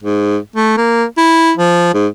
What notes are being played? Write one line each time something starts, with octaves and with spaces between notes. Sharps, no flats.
G#2
A3
A#3
E4
F3
G#2